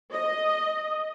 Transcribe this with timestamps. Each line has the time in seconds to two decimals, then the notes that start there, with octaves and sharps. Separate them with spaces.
0.12 D#5